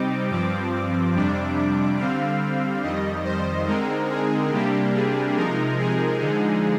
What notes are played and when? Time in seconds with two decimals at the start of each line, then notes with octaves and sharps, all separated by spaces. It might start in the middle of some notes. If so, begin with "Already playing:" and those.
Already playing: C3 G3 C4 D#4 D6
0.29 G2 F3 C4 D6
1.14 F2 C3 G3 D4
1.98 D3 G3 C4 F5
2.83 F2 D#3 G3 D#5
3.25 C5
3.67 D3 G#3 C4 D#4 A#4
4.09 G#4
4.51 C3 G3 A#3 D4 G4
4.94 G#4
5.35 C3 F3 G#3 D#4 A#4
5.78 G#4
6.20 D3 F3 G#3 D#4